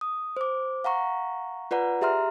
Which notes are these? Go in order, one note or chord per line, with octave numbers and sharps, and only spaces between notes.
D#6
C5 D6
F5 F#5 A#5 C#6
F4 B4 D5 F#5 A#5
G4 G#4 E5 A#5 C6 F6